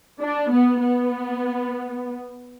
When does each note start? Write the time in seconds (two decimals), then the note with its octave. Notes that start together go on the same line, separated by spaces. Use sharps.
0.20 D4
0.52 B3
0.82 B3